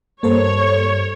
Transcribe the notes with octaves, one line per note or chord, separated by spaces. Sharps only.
G2 A#3 A4 C5 C#5